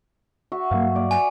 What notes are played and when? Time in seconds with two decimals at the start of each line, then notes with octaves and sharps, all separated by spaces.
0.52 F#4 E5 C#6
0.71 G2 F#3 A#3 F5
0.96 D5
1.11 G#5